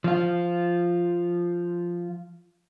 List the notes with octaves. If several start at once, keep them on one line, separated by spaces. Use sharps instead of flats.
F3 F4